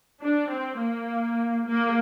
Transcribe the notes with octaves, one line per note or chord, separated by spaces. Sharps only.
D4
C4
A#3
A#3